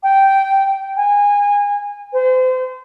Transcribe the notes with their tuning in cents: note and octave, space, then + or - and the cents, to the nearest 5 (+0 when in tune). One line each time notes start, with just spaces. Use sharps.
G5 -10
G#5 -25
C5 -35